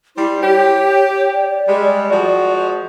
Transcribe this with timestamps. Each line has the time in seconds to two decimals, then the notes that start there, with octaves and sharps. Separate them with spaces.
0.17 G3 E4 C5
0.43 G4 C#5
1.34 D5
1.67 G3 G#3
2.10 F3 G#3 F#4